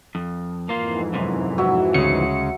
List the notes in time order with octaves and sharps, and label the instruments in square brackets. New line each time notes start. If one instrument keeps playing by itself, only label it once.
[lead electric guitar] F2
[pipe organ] F2 G#2 E3 [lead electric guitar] A#3 F4
[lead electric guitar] F#2 C3
[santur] F#3 E5
[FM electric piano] D2 C#7 [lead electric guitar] C#3 G#3